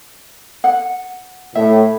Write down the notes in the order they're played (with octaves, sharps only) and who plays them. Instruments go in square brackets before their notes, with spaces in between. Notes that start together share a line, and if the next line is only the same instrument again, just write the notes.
[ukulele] F#5
[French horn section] A2 [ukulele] E5